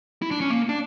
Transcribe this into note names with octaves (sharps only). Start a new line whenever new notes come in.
E4
D4
C#4
A#3
D4